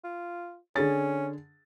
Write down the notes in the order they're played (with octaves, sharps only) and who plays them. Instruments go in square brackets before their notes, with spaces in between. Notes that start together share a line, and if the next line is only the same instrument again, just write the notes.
[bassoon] F4
[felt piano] D3 G#4 A6 [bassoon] C#4